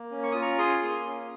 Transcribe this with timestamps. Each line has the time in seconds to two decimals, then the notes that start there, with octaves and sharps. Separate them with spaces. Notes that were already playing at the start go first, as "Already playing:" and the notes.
Already playing: A#3
0.11 C#4
0.23 C#6
0.32 F4 D#6
0.42 A#5 C#6
0.59 G#4 C6 D#6
0.83 A#3
1.07 C#4